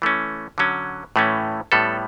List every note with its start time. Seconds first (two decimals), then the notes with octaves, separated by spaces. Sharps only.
0.02 E3 A3 C#4
0.58 D3 F#3 C#4
1.16 A2 E3 A3 C#4
1.72 A2 G3 B3 A4